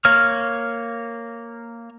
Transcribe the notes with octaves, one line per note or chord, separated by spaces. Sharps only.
A#3 C#5 F6